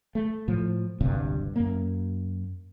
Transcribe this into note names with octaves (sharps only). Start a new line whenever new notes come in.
A3
A2 F3
D1 G1 G2 C3
F#2 A#3